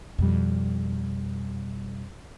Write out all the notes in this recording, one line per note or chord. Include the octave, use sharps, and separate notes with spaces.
F2 B2 G3